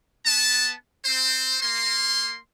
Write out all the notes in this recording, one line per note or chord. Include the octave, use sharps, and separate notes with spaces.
B3 A5
C4 C5
A#3 C6